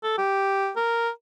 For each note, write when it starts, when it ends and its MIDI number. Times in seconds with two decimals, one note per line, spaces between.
0.04 0.14 69
0.18 0.71 67
0.76 1.09 70